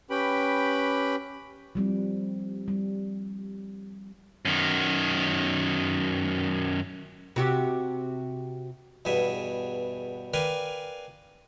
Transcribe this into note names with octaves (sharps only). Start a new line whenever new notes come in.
C#4 G4 B4 G5 B5
F3 G3 C4
G3
F#2 D#3
C3 F#4 G4
E2 G2 B2 G#4 E5
A#4 B4 D5 F5 G5 G#5